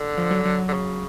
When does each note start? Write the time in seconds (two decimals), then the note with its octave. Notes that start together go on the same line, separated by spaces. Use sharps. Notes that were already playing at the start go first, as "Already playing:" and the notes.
Already playing: D3
0.18 F3
0.31 F#3
0.45 F#3
0.69 D3
0.74 C#3